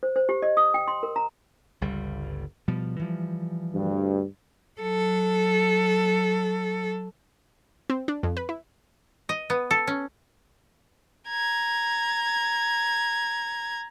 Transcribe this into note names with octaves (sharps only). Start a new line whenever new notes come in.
C5
C5
G4
D#5
D#6
G5
C6
A#4
A#5
G1 C#2 G3
B2 F3 G3
E3 F3 G3
D2 G2
F#3 A4
C4
D4
F2
B4
E4
D#5
B3
A4
C#4
A#5 G#6